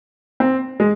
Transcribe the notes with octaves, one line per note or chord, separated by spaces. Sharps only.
C4
G#3